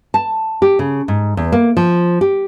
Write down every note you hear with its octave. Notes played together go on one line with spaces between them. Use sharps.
A5
G4
C#3
G#2
E2
A#3
F3
G4